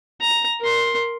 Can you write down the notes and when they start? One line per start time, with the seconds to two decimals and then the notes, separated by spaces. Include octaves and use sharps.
0.21 A#5
0.61 A#4 C6